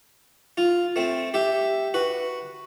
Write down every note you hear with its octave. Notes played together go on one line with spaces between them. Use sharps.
F4
A3 C4
G4 E5
F#4 B4